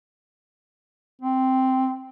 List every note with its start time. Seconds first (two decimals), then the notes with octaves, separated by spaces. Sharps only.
1.22 C4